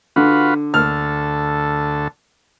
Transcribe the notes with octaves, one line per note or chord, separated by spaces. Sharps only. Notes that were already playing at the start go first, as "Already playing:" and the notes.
D3 F4 F#4 B4
D2 A4 F6